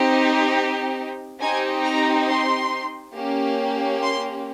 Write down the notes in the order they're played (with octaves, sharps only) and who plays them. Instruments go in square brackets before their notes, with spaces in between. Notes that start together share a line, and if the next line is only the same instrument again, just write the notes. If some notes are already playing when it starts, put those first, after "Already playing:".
Already playing: [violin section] C4 D#4 G4
C4 D#4 G4 G#5
A#5
C6
A#3 C#4 G4
C6